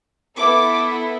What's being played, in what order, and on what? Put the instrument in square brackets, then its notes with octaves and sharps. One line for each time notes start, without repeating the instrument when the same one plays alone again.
[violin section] B3 E4 A4 D6